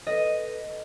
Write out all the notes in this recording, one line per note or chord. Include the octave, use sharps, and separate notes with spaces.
A4 B4 D#5